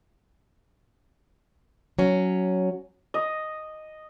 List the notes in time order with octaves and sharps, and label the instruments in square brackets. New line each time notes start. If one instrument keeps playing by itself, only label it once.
[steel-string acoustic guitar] F#3 C#4
[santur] D#5